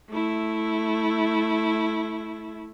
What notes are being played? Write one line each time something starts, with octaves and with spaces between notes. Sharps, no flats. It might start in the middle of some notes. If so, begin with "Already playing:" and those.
A3 E4